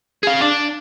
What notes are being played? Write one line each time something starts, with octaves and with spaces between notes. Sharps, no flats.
G#4 F5
D4